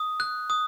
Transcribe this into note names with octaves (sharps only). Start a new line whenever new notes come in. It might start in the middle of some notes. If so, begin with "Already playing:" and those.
Already playing: D#6
F#6
D#6